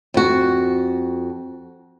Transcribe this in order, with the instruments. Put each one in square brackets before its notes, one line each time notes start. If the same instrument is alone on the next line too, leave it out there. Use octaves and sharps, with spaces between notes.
[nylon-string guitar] F2 F#4